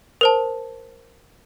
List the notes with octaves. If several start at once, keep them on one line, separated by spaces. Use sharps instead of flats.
A#4 C5 A5